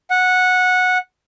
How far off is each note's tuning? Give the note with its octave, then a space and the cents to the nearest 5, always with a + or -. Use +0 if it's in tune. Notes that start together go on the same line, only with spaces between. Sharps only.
F#5 -15